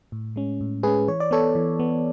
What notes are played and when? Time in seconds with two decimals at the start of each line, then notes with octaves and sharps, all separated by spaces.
0.12 A2
0.36 G#3 C#4
0.61 A2
0.83 G#3 C#4 G#4 B4
1.08 E3 C#5
1.20 D5
1.31 B3 A4 C#5
1.55 E3
1.79 B3